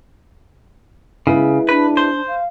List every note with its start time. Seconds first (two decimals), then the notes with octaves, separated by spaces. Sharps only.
1.27 C#3 G#3 B3 E4
1.69 D4 B4
1.97 C5
2.27 F5